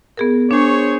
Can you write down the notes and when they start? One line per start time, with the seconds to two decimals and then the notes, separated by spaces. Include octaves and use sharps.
0.17 B3 G#4 A#4
0.51 D4 G#4 C5 C#5